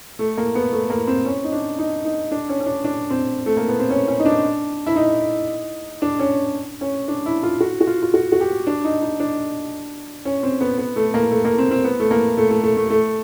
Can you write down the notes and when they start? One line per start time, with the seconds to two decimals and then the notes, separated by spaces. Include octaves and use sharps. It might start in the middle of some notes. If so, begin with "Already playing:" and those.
0.19 A3
0.38 A#3
0.55 B3
0.73 A3
0.90 A#3
1.07 C4
1.26 C#4
1.44 D#4
1.52 D4
1.79 D#4
2.05 D#4
2.32 D4
2.49 C#4
2.61 C#4
2.66 D4
2.84 D4
3.10 C4
3.46 A3
3.57 A#3
3.68 B3
3.79 C4
3.90 C#4
4.08 C#4
4.19 D#4
4.26 D4
4.86 E4
4.96 D#4
6.02 D4
6.19 C#4
6.81 C#4
7.08 D4
7.26 E4
7.43 F4
7.60 F#4
7.81 F#4
7.87 F4
8.02 F4
8.14 F#4
8.32 F#4
8.40 G4
8.67 D4
8.84 D#4
9.02 D#4
9.20 D4
10.25 C#4
10.43 C4
10.61 B3
10.78 B3
10.96 A3
11.14 A#3
11.31 A3
11.45 A#3
11.58 C4
11.71 C4
11.84 B3
12.00 A3
12.11 A#3
12.37 A3
12.51 A3
12.63 A3
12.77 A3
12.90 A3